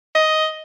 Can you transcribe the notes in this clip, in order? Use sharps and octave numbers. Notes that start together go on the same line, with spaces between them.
D#5